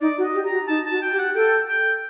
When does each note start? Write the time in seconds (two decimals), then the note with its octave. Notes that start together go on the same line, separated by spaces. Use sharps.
0.01 D#4 D5
0.18 F#4
0.23 D#5
0.35 G4
0.45 A#5
0.52 F#4
0.68 D#4 A5
0.86 F#4 A5
1.02 G5
1.13 G4
1.18 F#5
1.35 A4 G5
1.69 G5